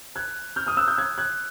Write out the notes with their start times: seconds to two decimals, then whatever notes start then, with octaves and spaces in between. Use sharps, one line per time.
0.16 F#6 G#6
0.56 F6 G6
0.67 D#6 F6
0.77 E6 F#6
0.88 F6 G6
0.98 F#6 G#6
1.18 F#6 G#6